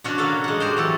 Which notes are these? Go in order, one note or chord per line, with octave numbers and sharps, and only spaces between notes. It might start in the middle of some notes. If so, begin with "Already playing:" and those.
B2 C#4 D4 F#4
A#3 F#4 A4
G#3 F#5
F#4 G4 C5
E3 F#3 A4